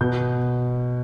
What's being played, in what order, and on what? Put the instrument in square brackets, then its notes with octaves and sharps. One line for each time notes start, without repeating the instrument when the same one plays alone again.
[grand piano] B2 G6